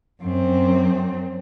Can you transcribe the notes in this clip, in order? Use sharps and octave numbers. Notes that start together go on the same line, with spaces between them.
F#2 C4